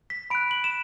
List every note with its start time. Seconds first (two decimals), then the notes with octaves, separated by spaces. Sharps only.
0.10 B6
0.30 B5 D7
0.35 F#6
0.51 F#7
0.64 E7